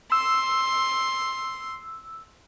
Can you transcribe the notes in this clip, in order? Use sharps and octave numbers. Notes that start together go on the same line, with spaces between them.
C6 E6